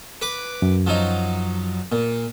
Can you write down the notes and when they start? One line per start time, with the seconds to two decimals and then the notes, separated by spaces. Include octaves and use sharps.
0.22 B4 D6
0.62 F#2
0.87 F3 F#3 D#4
1.92 A#2